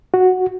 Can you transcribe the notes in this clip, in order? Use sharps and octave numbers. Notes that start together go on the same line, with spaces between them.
F#4